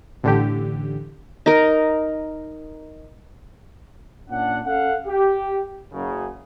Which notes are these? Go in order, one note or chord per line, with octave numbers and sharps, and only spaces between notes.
A1 D3 G4
D#4 A#4
A#2 C#4 D4 F#5
C#4 A4 F5 F#5
G4
F#1 F#2 C#3